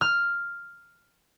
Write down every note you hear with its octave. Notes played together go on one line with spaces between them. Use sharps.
F6